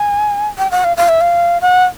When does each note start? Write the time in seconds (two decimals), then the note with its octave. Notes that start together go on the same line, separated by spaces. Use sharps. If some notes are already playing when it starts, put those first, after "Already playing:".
Already playing: G#5
0.58 G5
0.71 F#5
0.84 F5
0.97 F5
1.09 E5
1.21 F5
1.62 F#5